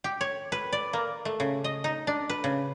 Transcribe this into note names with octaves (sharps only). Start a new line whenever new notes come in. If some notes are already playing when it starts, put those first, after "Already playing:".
G4
C#5
B4
D5
A#3
A3
C#3
D#5
D#4
D4
B4
C#3